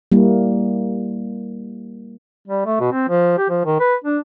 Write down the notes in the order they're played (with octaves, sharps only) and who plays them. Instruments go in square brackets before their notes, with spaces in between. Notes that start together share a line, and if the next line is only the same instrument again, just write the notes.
[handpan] G3 A#3 E4
[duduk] G3
A3
B2
C4
F3
G4
F3
D#3
B4
D4